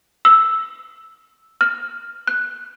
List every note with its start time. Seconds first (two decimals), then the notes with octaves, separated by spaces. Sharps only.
0.25 E6
1.61 F6
2.27 F#6